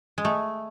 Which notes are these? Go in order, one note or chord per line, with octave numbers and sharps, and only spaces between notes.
G#3
A3